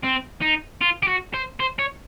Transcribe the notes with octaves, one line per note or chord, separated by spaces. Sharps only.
C4
D#4
F4
G4
F#4
C5
C5
C#5